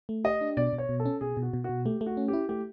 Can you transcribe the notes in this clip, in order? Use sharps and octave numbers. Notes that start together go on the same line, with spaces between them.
A3
G4 D#5
D4
B2 D5
B2
C#5
B2
A4
C#4
B2 G#4
B2
F#4
B2
B2 F#4
A3 G4
A3
F#4
C#4
G4
E4
A3 G4